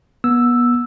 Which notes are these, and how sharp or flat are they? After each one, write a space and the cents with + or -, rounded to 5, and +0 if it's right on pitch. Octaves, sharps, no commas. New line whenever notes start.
B3 -30 E6 +0